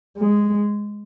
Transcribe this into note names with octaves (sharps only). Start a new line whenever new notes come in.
G#3